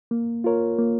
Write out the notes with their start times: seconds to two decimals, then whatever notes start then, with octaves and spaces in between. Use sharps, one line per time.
0.11 A#3
0.44 F4 A#4 C#5
0.79 A#3